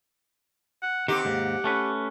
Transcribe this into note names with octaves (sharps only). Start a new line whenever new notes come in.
F#5
D#3 C4 G4 F#5
D#2 G#2
A3 C#4 B4